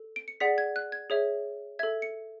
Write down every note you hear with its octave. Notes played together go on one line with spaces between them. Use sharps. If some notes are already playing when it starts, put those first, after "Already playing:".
Already playing: A4
D7
C#7
G#4 D5 F#5 B6
G#6
F#6
G#6
G#4 C#5 E5
A4 E5 G#6
C#7